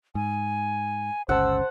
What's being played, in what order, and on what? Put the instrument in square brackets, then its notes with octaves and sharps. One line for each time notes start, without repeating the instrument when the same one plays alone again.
[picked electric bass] G#2 [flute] G#5
[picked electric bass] G1 C#2 C#3 [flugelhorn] C5 [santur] F#5 A5 [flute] E6